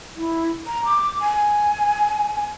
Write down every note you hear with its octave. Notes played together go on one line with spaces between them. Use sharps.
E4
A#5
D6
G#5